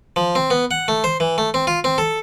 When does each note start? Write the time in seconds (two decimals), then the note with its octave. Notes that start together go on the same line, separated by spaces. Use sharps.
0.16 F3
0.35 C4
0.50 B3
0.71 F#5
0.88 A3
1.04 C5
1.20 E3
1.38 A3
1.54 C4
1.67 F4
1.84 C4
1.98 A4